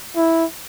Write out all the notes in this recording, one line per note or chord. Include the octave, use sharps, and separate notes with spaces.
E4